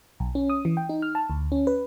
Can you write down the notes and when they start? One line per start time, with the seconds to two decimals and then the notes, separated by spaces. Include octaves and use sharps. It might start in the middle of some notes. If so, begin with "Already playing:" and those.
0.20 B1
0.35 C#4
0.50 D#6
0.65 E3
0.77 G5
0.89 D#4
1.02 F6
1.15 A5
1.30 D2
1.52 C#4
1.67 B4